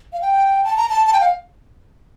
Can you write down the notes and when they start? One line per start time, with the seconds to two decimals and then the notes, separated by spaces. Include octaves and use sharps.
0.13 F5
0.22 G5
0.64 A5
0.77 A#5
0.89 A5
1.07 A5
1.13 G5
1.20 F5